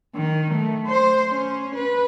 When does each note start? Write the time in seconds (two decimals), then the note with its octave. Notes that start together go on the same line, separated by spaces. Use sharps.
0.15 D#3
0.54 A3
0.87 C5
1.31 C#4
1.75 B4